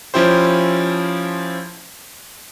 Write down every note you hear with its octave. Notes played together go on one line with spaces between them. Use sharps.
F3 C#4 E4 G4 C5